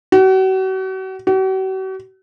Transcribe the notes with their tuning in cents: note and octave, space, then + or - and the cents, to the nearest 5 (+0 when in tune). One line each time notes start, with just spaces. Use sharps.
F#4 +40
F#4 +45